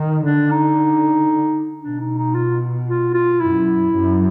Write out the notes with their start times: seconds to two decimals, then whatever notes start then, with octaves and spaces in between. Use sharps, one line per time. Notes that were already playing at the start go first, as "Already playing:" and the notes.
Already playing: D#3
0.24 D3 D4
0.51 D#4
1.82 B2 D4
2.00 D#4
2.18 D#4
2.35 F4
2.88 F4
3.14 F4
3.40 F#2 E4
3.93 F#2